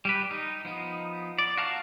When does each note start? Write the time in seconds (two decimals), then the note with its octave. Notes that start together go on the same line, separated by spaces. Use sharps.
0.05 G3 G4 B4
0.31 D#4
0.65 F3 B3 D#4
1.39 D5
1.57 F#4 F5 A5 A#5